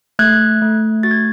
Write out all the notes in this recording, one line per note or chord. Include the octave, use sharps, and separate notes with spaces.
A3 F#6 G#6
A3
F#4 A6
G#6